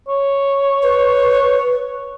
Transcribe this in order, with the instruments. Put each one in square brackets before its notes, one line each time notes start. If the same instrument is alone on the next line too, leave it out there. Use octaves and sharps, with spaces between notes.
[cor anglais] C#5
[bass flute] B4